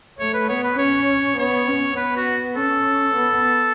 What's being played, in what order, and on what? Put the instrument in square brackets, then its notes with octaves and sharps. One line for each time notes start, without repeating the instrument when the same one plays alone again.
[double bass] A3 [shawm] C#5
[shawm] B4
[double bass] B3 [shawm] C#5
[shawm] B4
[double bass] C#4 [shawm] C#5
[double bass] B3 [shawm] C#5
[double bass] C#4
[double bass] B3 [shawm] B4
[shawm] F#4
[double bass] C#4 [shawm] A4
[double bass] B3